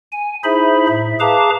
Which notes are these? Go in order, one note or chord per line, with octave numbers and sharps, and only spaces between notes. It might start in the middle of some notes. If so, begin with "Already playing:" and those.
G#5
D#4 E4 G#4 C5 E5 B5
A2 E5
G#4 B4 F5 A5 A#5 D6